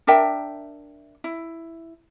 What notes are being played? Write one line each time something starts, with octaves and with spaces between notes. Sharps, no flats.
D4 A#4 E5 G5
E4